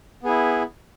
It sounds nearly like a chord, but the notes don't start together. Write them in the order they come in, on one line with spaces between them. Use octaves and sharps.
B3 G#4 E4